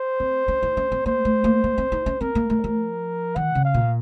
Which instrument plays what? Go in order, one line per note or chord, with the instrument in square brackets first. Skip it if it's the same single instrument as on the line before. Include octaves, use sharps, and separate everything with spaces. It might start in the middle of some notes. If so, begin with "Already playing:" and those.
Already playing: [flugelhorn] C5
[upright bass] C4
C#4
D#4
C#4
C4
[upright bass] A#3 [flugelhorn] C5
[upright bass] A3
A#3
A#3
C4
D#4
C#4
[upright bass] C4 [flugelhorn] A#4
[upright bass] A#3
A3
F3
[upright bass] D#3 [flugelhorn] F#5
[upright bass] C#3
[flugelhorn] F5
[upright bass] A#2